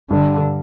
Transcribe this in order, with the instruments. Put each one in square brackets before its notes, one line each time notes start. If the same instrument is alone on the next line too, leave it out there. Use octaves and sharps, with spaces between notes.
[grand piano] G2 [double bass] D3